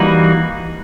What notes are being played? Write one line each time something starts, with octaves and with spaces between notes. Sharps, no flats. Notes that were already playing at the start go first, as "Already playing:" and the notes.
Already playing: E3 G3 A#3 D#4 F#4